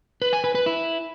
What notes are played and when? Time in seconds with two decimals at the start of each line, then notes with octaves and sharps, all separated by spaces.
0.22 B4
0.33 G#5
0.44 B4
0.55 B4
0.66 E4